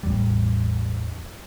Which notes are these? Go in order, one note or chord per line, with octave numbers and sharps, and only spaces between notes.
A1 E2 G3